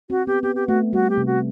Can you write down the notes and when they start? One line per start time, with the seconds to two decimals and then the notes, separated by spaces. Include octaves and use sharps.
0.10 C4 F#4
0.27 B3 G4
0.43 B3 G4
0.55 G4
0.68 A3 F#4
0.93 G3 F#4
1.10 G4
1.17 C3
1.26 F#4